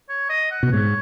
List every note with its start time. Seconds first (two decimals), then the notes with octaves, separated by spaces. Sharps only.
0.09 C#5
0.30 D#5
0.51 F#5
0.63 B2
0.72 G#2 C#5